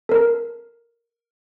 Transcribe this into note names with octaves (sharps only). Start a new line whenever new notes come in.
A4 A#4